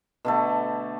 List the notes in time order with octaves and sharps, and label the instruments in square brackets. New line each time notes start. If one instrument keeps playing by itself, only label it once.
[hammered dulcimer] B2 D3 A3